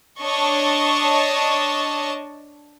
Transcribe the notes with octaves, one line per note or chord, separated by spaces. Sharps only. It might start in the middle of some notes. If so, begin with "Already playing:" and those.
D4 C#5 D#5 A5 C#6